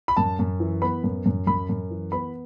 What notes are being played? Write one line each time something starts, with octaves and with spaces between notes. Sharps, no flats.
B5
F#2 A5
F#2
E3
B3 B5
F#2
F#2
F#2 B5
F#2
E3
B3 B5